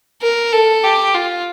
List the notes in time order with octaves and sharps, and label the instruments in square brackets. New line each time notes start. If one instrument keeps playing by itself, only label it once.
[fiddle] A#4
A4
G4
F4